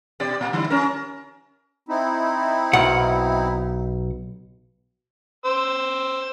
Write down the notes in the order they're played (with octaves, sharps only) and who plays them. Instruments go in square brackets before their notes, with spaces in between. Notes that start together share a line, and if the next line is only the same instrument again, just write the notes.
[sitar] B2 G4 D5
A#2
D3 G3 E4
C#4 A#4
[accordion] C4 D#4 E4
[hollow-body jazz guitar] B1 F#5
[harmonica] C5 E6